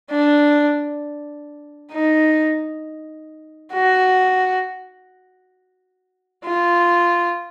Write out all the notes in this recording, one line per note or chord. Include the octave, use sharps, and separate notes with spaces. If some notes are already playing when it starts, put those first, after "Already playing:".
D4
D#4
F#4
F4